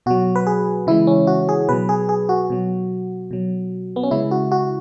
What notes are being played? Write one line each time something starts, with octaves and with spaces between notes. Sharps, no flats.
B2 F#3 F#4
B4
G#4
C#3 E3 G#3 E4
C#4
F#4
G#4
B2 F#3 B4
G#4
G#4
F#4
B2 F#3
B2 F#3
B3
C#4
C#3 G#3 E4
F#4
F#4